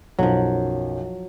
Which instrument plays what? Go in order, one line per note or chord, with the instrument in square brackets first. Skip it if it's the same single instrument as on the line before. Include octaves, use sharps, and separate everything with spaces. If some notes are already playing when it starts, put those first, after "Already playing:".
[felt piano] B1 F#2 [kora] F3 F#3